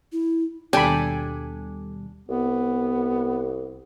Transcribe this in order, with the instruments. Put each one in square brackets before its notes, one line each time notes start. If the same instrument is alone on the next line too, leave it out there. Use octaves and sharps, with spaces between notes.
[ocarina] E4
[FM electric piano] D#2 B2 G3 [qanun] D4 A4 [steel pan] G5 B5 [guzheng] G#5
[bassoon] C2 [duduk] B3